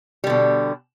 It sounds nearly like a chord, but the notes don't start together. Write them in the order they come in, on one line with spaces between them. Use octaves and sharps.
G3 D3 B2